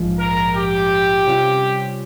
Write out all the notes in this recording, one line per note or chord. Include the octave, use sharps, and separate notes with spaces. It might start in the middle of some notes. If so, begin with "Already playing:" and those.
Already playing: A#1 G#2 F3 G#3
A#4
G4
C3 G3 C#4 F4